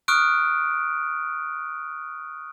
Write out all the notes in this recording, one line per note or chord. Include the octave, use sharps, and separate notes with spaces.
C#6 D#6 F6 F#6 D7